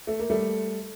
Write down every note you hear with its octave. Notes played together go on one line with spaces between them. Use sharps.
A3
A#3
G3 A3